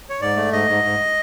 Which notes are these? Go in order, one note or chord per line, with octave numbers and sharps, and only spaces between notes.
C#5
G#2 D5
A3
G#2 D#5
G#2
G#2